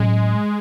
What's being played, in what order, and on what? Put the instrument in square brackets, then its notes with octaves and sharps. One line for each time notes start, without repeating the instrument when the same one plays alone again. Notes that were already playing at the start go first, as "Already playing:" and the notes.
Already playing: [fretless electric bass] A2 F#3 C#4 [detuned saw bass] G#3